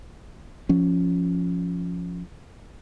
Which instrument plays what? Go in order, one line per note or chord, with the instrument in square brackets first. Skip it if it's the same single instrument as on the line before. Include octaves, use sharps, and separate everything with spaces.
[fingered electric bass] F3 C#4